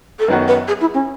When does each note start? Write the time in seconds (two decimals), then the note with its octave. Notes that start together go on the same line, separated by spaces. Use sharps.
0.19 A4
0.28 F#2 D#3 F#3 B3 F#4 B4
0.48 B4
0.68 G#4
0.81 E4
0.94 C#4